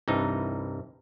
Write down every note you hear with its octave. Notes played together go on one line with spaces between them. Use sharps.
C2 G2 E3 D#4